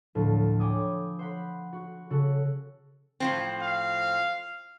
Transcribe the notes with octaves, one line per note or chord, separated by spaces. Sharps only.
D2 A2 F3
C#5 G5 G#5 B5 D6 D#6
C5 F#5 B5
F#4
C#3 F#4 A4
A2 F3 C4
F5